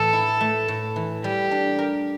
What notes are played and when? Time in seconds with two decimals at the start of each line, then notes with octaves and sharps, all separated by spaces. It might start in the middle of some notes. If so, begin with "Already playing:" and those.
Already playing: A2 E3 A4
0.13 E4
0.41 A3
0.68 A2
0.96 E3
1.24 G3 G4
1.51 D4
1.79 A#4